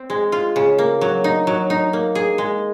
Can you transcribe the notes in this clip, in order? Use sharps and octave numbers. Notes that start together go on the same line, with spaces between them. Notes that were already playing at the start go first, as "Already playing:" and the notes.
Already playing: C4
G#3
F4
C#3
A#3
F#3
D#4
F#3
D#4
A#3
G#4
G#3